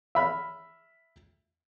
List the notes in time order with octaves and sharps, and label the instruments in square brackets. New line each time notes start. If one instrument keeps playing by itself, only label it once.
[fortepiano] E5 B5 F6